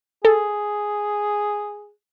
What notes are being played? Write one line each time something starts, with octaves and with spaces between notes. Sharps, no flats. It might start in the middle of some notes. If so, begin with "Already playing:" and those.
G#4 A4